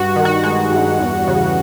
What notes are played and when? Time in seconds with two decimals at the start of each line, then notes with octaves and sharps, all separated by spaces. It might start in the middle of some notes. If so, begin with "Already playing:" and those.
Already playing: G2 F#4
0.16 D#3
0.25 F#4
0.44 G#3 F#4
0.72 G2
0.99 E2
1.27 C#3